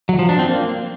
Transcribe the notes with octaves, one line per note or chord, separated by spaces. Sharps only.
F#3
F3
D4
C4
A#3